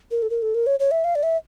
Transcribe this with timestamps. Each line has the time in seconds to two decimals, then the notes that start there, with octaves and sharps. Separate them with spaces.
0.11 A#4
0.22 A4
0.30 A#4
0.42 A4
0.55 A#4
0.67 C#5
0.80 C#5
0.91 E5
1.04 F5
1.15 D5
1.23 E5